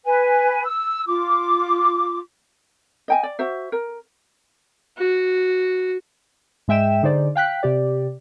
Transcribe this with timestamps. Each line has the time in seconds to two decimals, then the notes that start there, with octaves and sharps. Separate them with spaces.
0.05 B4 G#5
0.65 E6
1.07 F4 D6
3.08 D#5 G5 G#5
3.23 D5
3.39 F#4 C5 E5
3.72 A#4
4.98 F#4
6.68 G#2 G#3 E5 G5 E7
7.03 D3 D#4 G#4 C5 D5
7.36 F5 G5 F#6 B6
7.63 C3 G4 D5